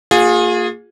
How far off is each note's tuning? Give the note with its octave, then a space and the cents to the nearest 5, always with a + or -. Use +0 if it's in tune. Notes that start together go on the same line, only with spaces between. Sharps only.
A#3 -25 F4 +35 G#4 -5